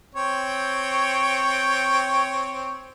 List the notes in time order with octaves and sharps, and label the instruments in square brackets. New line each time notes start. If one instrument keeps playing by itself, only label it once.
[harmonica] C4 C#5 G5